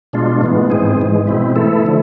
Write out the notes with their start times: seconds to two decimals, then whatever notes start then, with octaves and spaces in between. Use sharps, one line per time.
0.13 B2 G#3 D4 F4
0.42 A2 E3 G#3 B3
0.70 G#2 E3 G#3 C4 G#4
0.99 G#2 E3 G#3
1.27 B2 G#3 C4 E4
1.56 E3 A3 E4 A4
1.85 D3 F3 A3